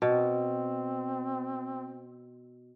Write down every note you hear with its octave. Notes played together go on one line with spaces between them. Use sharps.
B2 C4